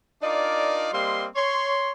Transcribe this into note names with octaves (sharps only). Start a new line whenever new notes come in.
D4 D#4 F4 A#4 D5
G3 A#3 C4 D#5 C6
C#5 C6